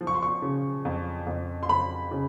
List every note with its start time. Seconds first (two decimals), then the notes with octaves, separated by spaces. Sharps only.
0.01 F3
0.07 C#6
0.15 C6
0.23 C#6
0.42 C#3
0.85 F2
1.27 F2
1.63 C6
1.69 F2 B5
2.11 C#3